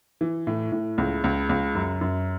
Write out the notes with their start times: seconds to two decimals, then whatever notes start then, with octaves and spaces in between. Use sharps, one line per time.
0.21 E3
0.47 A2
0.72 A2
0.98 C#2
1.24 C#2
1.49 C#2
1.75 F#2
2.01 F#2